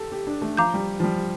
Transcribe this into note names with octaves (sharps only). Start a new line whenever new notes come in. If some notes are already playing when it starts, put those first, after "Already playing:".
Already playing: G4 A4
G4
D4
A3
F3 F5 A#5 D6 G6
G3
F3
G3